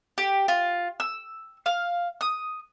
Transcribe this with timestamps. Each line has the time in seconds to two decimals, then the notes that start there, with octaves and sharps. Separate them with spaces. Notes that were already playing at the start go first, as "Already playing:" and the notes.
0.18 G4
0.48 F4
1.00 E6
1.66 F5
2.21 D#6